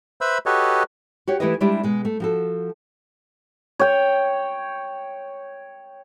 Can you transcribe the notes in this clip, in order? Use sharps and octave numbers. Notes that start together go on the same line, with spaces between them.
B4 C5 E5 B5 E6
F#4 G4 A4 B4 C#5 D#5
F#4 G4 C#5
E3 A3 E4 G4 B4 D#5
G3 G#3 D4 E4 G4 D5
B2 G#3
A3
F3 F#4 A4
C#5 G5